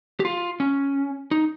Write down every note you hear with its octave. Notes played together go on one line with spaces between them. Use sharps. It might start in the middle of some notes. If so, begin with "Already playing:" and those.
G4
F4
C#4
D#4